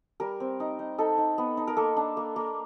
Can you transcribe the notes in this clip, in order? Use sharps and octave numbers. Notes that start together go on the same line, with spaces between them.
G3 A#4
C4
D#4
D#4
D#4 A4
D#4
B3
D#4
A#4
A#3 A4
D4
A#3
A#3